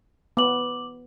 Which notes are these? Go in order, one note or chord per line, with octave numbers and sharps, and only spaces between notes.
B3 D6 F#7